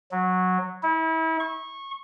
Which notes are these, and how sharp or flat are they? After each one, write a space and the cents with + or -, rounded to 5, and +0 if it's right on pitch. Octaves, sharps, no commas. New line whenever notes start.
F#3 -10
E4 -35
C#6 -20